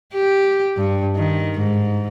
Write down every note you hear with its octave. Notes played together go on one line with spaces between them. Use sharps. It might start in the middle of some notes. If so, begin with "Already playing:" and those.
G4
G2
D#3
G#2